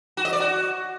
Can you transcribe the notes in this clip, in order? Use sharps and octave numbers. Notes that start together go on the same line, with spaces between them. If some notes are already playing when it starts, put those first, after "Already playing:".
F#4
D#5
D5
F#4